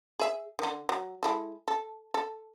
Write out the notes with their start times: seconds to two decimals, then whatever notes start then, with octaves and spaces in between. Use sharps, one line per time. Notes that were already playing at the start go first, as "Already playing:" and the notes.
0.19 G#4 E5
0.59 D3 D#3
0.89 F#3
1.23 G#3 E4 A4
1.68 A4
2.14 A4